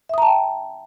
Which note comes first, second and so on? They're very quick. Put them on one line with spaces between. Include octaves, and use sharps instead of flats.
E5 D#6 A#5 A5 G5